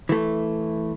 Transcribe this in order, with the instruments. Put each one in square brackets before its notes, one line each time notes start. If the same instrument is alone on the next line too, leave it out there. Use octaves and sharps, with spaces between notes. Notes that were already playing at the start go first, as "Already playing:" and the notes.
[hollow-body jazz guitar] E3 A3